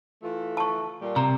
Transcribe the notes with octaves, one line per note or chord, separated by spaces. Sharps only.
E3 A3 F4
A5 C#6
A#2 G3
C3 A#5